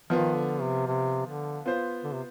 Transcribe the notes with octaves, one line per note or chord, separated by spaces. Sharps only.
D#3 F3 B3 F4
D3
C3
C3
D3
B3 F4 C5
D3
C3